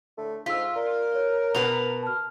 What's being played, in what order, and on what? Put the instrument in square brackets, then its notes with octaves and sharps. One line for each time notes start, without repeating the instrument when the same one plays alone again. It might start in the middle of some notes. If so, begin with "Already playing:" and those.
[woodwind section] A2 D3 A3
[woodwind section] G#2 [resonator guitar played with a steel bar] F4 [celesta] E6 B6
[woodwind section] A#4 [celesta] D5
[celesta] C#5
[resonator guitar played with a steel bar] B2 F#4 B4 [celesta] F7
[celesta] A5 F6